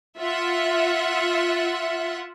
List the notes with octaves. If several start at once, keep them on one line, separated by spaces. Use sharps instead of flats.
F4 E5 F#5